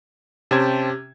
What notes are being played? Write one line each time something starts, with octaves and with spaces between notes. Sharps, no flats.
C3 C#4 G4 C5 G5 A5 G#6